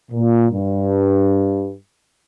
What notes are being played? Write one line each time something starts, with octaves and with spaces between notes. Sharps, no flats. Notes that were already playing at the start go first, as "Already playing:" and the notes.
A#2
G2